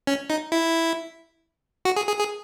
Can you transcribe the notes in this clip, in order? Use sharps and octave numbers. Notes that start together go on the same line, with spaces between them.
C#4
D#4
E4
F#4
G#4
G#4
G#4